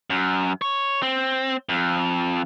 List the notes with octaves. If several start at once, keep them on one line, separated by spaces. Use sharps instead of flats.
F#2
C#5
C4
F2